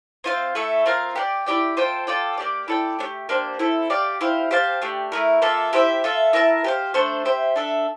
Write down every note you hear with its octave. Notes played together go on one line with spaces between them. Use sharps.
C4 F4 C5 F5
A3 E4 A4 E5
C4 F4 A#4 F5
G4 A#4 D5
E4 G4 D5 G5
F4 A4 C5 G5
F4 A4 D5 G5
A#3 D4 G4 D5
E4 A4 D5 G5
A3 D4 G4
A#3 D4 G4 C5
C4 E4 A4
G4 D5 F5
E4 G4 C5 F5
G4 C5 F5 A5
A3 D4 G4
A3 E4 A#4
A#3 F4 A4 E5
E4 G4 C5 E5
F4 A4 E5
E4 A#4 E5 A5
G4 C5 F5
A3 D4 A4 C5
G4 C5 E5
D4 A4 E5